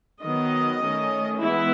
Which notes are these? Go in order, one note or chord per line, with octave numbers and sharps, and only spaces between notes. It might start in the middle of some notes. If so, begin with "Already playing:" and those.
D#3 F#3 B3 D#5
D#3 A3 C#4
E3 G#3 B3 E4